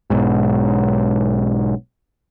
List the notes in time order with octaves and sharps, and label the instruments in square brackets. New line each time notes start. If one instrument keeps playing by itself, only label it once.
[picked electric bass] B1 G#2